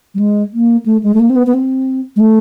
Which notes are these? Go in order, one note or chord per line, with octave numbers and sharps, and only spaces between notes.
G3
G#3
A#3
A3
G#3
A3
A#3
C4
B3
B3
C4
G#3
A3